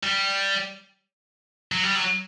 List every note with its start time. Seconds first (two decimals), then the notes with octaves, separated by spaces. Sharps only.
0.04 G3
1.72 F#3
1.83 G3
1.96 F#3